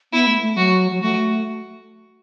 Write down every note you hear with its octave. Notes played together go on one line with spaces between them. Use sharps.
B3 E4
A3
A3
F#3 F#4
F#3
A3 F#4